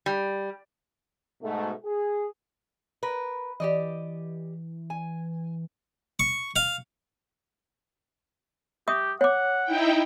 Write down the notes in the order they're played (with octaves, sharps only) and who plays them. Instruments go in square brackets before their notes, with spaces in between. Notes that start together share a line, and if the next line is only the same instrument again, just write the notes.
[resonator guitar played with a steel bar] G3
[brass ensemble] G#2 B2 A3
G#4
[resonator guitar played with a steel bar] A#4 B4
[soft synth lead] E3 [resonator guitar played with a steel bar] G4 D5 D#5
[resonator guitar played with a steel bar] G#5
[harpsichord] C#6
F5
[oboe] G4 [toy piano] E5 C#6 D#6
[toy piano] C#5 D6 [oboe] F#5
[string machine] D#4 E4 G5